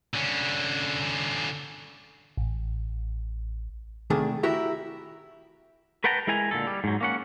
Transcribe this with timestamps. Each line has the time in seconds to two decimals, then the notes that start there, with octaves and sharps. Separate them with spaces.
0.14 D3 C#4
2.37 A1
4.10 C2 D#3 A3 D4 G#4
4.43 E4 F#4 G4 A#4
6.04 A#4 B4 F#5 G5 A5 A#5
6.27 G#3 E4 A#4 G#5 A#5
6.51 A#2 D3 A4
6.67 G3
6.84 G#2 F#3
7.01 A#3 C#4 F#5